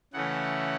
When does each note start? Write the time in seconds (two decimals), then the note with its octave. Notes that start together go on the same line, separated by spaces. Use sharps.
0.13 C#3 E3 A3 C#4 F#5